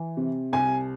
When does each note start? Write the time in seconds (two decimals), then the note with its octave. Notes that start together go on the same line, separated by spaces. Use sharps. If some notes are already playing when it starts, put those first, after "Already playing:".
Already playing: E3
0.17 C3
0.53 C2 G#5